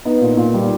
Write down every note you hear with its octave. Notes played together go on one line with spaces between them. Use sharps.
B3 D#4
A#2
A#2
G3